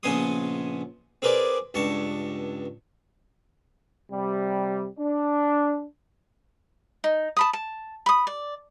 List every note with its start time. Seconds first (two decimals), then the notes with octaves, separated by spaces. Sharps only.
0.03 A#1 C#3 B3 G#5 C6 D#6
1.22 C4 G#4 A#4 B4 D5
1.74 C#2 G2 A5 C#6
4.10 C3 G3
4.96 D4
7.04 D#4
7.37 A5 B5 D#6
7.53 A5
8.06 B5 D#6
8.27 D5